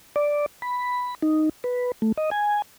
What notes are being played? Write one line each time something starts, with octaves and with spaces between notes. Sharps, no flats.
D5
B5
D#4
B4
A3
D#5
G#5